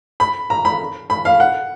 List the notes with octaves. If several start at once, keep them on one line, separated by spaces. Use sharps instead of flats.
B5
A#5
B5
B5
F5
F#5